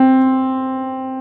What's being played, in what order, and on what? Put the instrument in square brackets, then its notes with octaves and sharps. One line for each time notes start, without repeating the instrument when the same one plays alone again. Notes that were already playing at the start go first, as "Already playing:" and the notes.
Already playing: [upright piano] C4